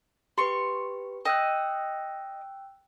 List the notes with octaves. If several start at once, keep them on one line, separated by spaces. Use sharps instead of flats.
G4 B4 C6 C#6
D#5 G5 E6 F#6